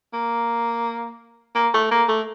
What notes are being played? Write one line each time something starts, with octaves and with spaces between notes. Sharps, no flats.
A#3
A#3
A3
A#3
A3